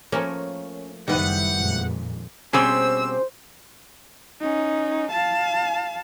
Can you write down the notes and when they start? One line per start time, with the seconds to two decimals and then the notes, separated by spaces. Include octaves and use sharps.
0.12 F3 A3 A#3 C#4 A#4
1.08 F#1 D#3 G3 B3 E4 F#5
1.56 F2 A#2 G#3
2.53 B2 G3 C4 C#4 G#4 C5 E6
4.40 C#4 D#4
5.11 F5 A5